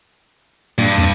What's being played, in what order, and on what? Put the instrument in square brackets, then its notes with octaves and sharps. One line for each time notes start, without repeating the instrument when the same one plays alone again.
[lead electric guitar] G2 [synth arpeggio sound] A#2 A#3
[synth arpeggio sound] F2